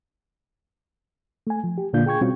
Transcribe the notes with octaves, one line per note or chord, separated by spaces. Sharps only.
A3 G#5
F3
G4
A#2 D3 A#3 D4 F4 G6
G#4 G5 C#6 G#6
B2 G3 C4 C#4 F4 F#4